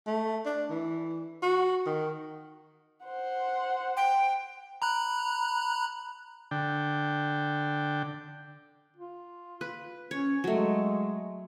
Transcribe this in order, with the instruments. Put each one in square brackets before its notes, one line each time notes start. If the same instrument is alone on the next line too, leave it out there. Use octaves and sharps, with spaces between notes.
[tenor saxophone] A3
D4
E3
F#4
D#3
[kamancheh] C5 F#5
[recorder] G5
[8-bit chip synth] A#5 B5 F#6
[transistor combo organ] D3 G5
[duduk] F4
[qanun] B4
[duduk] C#4 [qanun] C#5
[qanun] F#3 A3 [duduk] G#3